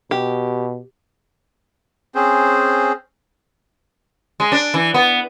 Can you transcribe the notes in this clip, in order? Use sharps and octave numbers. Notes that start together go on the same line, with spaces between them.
B2 G4
C4 C#4 G#4 C5
G#3
D4
E3
B3